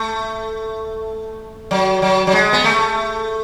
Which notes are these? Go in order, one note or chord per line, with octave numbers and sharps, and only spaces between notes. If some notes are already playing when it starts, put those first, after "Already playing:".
Already playing: A3
F#3
F#3
F#3
G#3
B3
A3